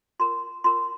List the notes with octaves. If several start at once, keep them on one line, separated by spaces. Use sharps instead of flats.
F4 A#4 C6
F4 A#4 C6